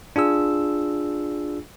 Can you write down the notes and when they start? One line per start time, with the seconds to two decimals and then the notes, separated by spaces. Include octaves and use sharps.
0.16 D4 F4 G#4 E6